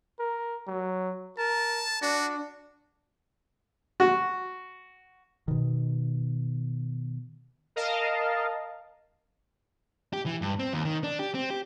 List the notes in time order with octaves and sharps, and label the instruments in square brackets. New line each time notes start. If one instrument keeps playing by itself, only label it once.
[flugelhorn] A#4
F#3
[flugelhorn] A#4 [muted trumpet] A5
[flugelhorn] D4 [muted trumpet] F#4
[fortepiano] F#4
[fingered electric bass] B2 D#3
[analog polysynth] A#4 D#5 F5 A5
[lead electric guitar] G4
E3
G2
C4
D#2
D#3
D4
G4
C4
G4